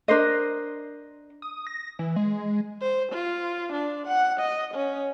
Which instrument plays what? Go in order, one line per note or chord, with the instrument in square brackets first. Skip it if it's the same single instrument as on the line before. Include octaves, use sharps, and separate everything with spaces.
[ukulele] D4 A#4 C5 D#5
[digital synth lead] D#6
A#6
E3
G#3
[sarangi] C5
F4
D4
F#5
D#5
C#4